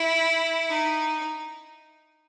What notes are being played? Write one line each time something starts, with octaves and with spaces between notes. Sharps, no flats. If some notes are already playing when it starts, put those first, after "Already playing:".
Already playing: E4
D#4